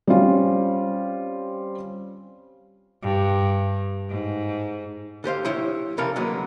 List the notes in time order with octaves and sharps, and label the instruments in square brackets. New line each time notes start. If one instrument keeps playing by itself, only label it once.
[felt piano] G3 C4 C#4 F4 F5
[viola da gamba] G2
G#2
[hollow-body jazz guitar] D3 G4 C5 F5
F3 E4 G4 C#5
C3 E3 C#4 A4 A#4 F5
D3 F#3 G#3 A#3 B3